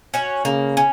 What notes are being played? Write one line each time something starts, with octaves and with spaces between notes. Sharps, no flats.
C#4 F#4 C#5
C#3 A#3
C#4